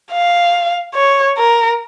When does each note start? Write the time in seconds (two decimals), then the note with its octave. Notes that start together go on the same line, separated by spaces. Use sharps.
0.12 F5
0.95 C#5
1.38 A#4